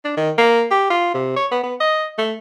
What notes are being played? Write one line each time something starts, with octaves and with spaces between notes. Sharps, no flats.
D4
D#3
A#3
G4
F4
C3
C#5
B3
B3
D#5
A3